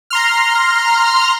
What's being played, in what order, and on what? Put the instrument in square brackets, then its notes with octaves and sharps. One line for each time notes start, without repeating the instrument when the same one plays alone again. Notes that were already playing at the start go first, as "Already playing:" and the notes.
[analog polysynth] A#5 C6 F6